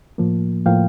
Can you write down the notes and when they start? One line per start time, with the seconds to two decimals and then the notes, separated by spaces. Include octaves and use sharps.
0.18 A2 F3 A#3
0.65 A2 F3 A#3 F5 G5